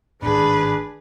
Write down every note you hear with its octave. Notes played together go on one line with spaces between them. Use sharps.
G#1 A2 D4 G#4 B4